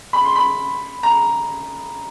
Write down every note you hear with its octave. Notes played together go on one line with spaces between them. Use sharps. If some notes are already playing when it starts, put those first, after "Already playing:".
B5
C6
B5
A#5